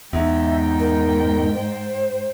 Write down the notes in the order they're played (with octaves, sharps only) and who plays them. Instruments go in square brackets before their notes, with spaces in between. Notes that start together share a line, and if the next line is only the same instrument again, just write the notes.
[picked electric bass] E2 [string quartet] G#2 G5 [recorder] D#4 [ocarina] E5
[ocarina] A#4
C5